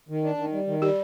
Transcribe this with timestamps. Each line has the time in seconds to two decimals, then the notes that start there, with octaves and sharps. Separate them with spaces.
0.09 D#3
0.23 D4
0.38 D#3
0.53 G3
0.67 D#3
0.82 G3 G4